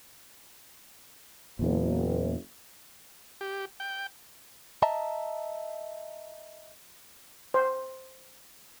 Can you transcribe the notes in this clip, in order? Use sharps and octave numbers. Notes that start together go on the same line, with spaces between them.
F#1 E2 A#2
G4
G5
D#5 E5 A5 A#5
C5